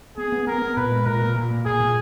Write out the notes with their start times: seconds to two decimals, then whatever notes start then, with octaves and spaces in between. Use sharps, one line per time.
0.17 B3 G#4
0.32 B3
0.47 B3 A#4
0.62 B3
0.76 A#2 B4
0.91 G#3
1.06 A#2 A#4
1.21 A#2
1.36 A#2
1.50 A#3
1.65 A#2 G#4
1.80 A#2